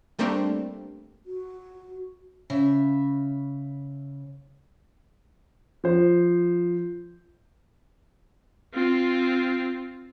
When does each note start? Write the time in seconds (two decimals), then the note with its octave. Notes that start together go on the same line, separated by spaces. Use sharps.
0.19 G3 A3 A#3 C4 D4 G4
1.26 F#4
2.50 C#3 E5
5.84 F3 C5
8.74 C4 F4